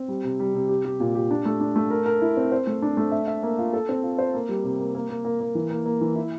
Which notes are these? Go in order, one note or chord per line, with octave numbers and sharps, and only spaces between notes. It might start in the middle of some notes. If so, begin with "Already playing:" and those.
Already playing: C4
G3
C3
G3
C3
G4
G4
A#2
G4
D4
A3
D4
A3
A#4
A#4
E4
C4
C5
A3
D4
A3
E5
E5
A#3
F4
A4
C4
F4
C5
A#3
G3
C3
A#3
A#3
A#3
A#3
A#3
E3
A#3
A#3
E3
E4